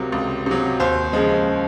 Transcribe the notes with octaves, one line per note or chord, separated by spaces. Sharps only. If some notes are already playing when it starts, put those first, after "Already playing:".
Already playing: C#2 C3 F#3 A#4
C#2
C3 F#3
D#2 C5
C#3 F3 G#3